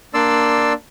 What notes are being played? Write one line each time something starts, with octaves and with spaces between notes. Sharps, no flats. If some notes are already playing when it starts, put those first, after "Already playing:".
A#3 D4 D5 C6 E6